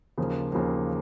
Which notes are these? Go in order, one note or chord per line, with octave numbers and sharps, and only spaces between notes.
D#2 C#3 F3 A#3
D#2 C#3 F3 A#3